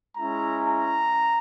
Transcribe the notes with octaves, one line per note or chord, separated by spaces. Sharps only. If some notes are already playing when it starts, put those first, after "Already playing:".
G#3 C#4 E4 A#5
A#5